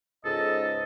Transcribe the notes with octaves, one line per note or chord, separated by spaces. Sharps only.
C#2 G#2 A4 D#5